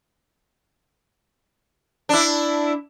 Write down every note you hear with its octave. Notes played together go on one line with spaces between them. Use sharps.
D4 E4